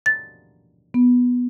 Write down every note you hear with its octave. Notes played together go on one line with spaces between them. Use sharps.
A6
B3